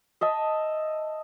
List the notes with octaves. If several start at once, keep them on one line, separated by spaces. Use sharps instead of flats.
D#5 E5 A5